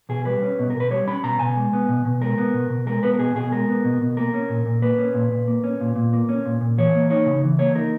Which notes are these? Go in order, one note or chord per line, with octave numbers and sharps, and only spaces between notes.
B2 G#4
G3 B4
C#4
B2
A#4
B2
B4
G3 C#5
C#4 B5
B2 A#5
B2 G#5
G#3
B3
B2
B2
G#3 A#4
B3
B2
B2
G#3 A#4
B3 B4
A#4
B2 G#4
B2 G#4
G#3 A#4
B3
B2
B2
A#3 A#4
C#4
A#2
A#2
A#3 B4
C#4
A#2
A#2
A#3
C#4
A#2
A#2
A#3
C#4
A#2
A#2
E3 C#5
A#3
D#4 C#5
C#3
E3
A#3 C#5
D#4 A#4